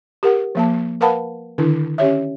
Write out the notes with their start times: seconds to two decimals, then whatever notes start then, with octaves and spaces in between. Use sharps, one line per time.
0.23 G4 A#4 F#5
0.55 F3 A#3 A5
1.01 A#4 B4 F5 F#5 A5 B5
1.58 D3 D#3 D4 E4
1.98 C#4 G4 C#5 E5